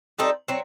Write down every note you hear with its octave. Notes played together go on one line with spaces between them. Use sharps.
G3 C4 D#4 A4
F#3 C4